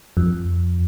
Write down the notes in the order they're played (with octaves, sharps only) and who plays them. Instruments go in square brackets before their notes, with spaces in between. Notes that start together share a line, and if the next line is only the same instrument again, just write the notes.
[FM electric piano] F2